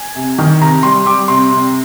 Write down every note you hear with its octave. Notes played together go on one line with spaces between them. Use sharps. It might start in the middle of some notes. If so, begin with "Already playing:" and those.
Already playing: G#5
C3
D#3
C3 A#5
G3 C6
G3 D6
C3 C6
C3